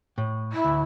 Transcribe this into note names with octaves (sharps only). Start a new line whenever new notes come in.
A2
E4
D2